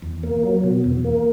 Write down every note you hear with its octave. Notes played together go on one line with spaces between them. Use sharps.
E2
A#3
F#3
B2
E2
A#3